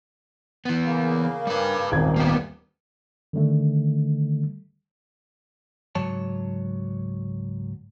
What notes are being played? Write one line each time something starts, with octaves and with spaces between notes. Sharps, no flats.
E3 B3
C#3 A#3
G3 B4
D#1 G#1 G#6
A#3 B3 G4
D3 D#3 G3 A3
C#2 G#2 F#3 C#5 A5